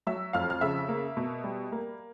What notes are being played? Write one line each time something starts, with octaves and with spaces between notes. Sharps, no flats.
F#3 E5 E6
F2 F5 F6
F6
C#3 E5 E6
A#3
B2
G3
A#3